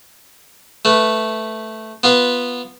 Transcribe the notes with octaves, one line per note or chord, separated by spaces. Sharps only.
A3 B4
B3 F4 B4